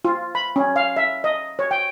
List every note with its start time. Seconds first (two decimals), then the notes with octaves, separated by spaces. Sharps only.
0.05 F4
0.35 B5
0.56 C#4
0.76 F5
0.97 E5
1.24 D#5
1.59 C#5
1.71 G5